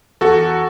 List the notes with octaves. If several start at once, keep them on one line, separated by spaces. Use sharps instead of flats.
E2 F#4 A4